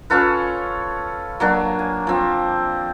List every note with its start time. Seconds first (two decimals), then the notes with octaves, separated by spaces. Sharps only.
0.10 C#4 F4 A4 B4
1.40 F#3 A#3 D4
1.79 G#5
2.07 F3 C4